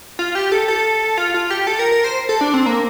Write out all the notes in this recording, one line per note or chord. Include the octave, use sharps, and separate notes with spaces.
F4
G4
A4
A4
F4
F4
G4
A4
A#4
A#4
C5
A4
D4
C4
A#3